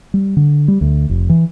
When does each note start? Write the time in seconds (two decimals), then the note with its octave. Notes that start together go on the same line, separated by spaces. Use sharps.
0.14 G3
0.37 D3
0.68 G3
0.81 D2
1.09 F1
1.29 E3